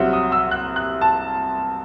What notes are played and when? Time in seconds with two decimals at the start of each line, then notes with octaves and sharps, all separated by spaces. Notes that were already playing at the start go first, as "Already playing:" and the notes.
Already playing: C2 C3 F#3 E5 F#5
0.13 D#6
0.32 E6
0.51 F#6
0.76 F#6
1.01 A5